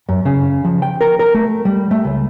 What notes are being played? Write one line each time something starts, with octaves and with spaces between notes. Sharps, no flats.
F#2
C#3
F3
G5
A#4
A#4
A3
G3
A3
C#2